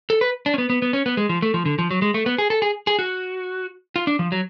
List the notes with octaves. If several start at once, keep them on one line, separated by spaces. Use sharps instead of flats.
A4
B4
D4
C#4
B3
B3
B3
C#4
B3
G#3
F3
A3
F3
D3
F3
F#3
G#3
A3
B3
G#4
A4
G#4
G#4
F#4
F4
D4
F3
F#3